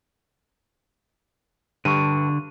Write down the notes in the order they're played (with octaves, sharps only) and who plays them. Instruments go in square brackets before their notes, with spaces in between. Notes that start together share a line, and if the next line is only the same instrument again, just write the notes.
[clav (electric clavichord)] G2 [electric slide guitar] D3 [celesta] C#6 D#7